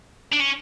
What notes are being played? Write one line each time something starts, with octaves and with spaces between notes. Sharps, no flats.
D4
C#4